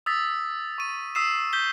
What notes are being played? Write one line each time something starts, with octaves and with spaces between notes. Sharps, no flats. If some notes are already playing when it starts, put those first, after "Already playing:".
D#6 E6 A6 B6
C#6 D#7
D#6 E6 B6 C7 D#7 E7
G6 B6 G7